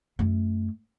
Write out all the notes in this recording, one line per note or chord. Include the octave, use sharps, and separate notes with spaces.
F#2 A3